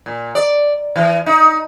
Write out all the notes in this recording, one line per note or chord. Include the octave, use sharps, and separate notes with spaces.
A#2
D5
E3
D#4